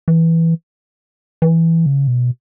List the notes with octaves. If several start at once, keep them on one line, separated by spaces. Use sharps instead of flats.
E3
E3
C#3
B2